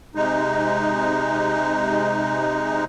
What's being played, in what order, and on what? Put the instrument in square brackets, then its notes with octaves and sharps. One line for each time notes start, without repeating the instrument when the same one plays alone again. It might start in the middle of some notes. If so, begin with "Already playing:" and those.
[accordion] C3 G#3 D#4